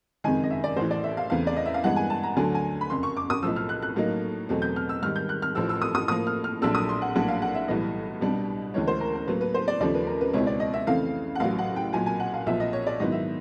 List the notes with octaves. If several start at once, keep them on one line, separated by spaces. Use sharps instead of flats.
F#1 F2 C3 D#3 G#3 G#5
D#5
E5
D5
A1 A2 E3 C5
D5
E5
F5
E2 C#3 E3 A3 C4 F5
D5
D#5
E5
F5
G2 E3 G#3 B3 F#5
G#5
A5
A#5
D2 D3 F#3 A3 D4 G#5
G#5
B5
F#1 F2 C#3 C6
C#6
D6
D#6
B1 A2 F3 E6
F6
F#6
F#6
A2 F#3 A#3 D#4
E2 B2 F#3 A3 C4
G6
F6
E6
G#2 D#3 G3 F6
G6
F#6
F6
A1 A2 F3 E6
E6
D#6
D#6
A2 F3 A#3 D#6
F6
F6
A#1 A#2 F#3 A3 D4 E6
D#6
C6
F#5
A#1 A2 F#3 A#3 D4 F#5
F5
F#5
E5
B1 A2 E3 G3 B3 D#5
C2 B2 G3 B3 D4
D2 C#3 E3 G#3 C#5
C5
A#4
A#4
A2 F#3 A#3 B4
B4
C5
D5
D#2 C#3 F3 A3 C#4 D5
B4
A#4
B4
C#2 B2 G#3 C4 E4 C#5
D5
D#5
E5
F2 C#3 E3 A3 C4 F5
F#5
A1 A2 F#3 F5
F#5
G5
B1 A#2 F#3 G#5
G#5
F#5
F5
B1 A#2 F3 E5
D#5
C#5
D5
G#2 D#3 F#3 B3 E4 D#5
E5